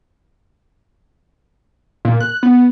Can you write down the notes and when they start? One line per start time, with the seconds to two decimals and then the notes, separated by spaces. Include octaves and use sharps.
2.05 A#2
2.20 F#6
2.43 B3